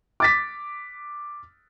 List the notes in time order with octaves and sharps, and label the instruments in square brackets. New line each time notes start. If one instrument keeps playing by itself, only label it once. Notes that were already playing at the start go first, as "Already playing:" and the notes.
[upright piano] D6 A6 B6